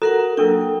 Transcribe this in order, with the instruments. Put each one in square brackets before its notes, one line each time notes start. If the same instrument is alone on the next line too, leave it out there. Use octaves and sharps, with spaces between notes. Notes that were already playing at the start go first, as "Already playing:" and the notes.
[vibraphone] F#4 A#4 F#5 [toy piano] A4 A#5
[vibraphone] F#3 A#3 G5 [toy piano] D4 A4 A#4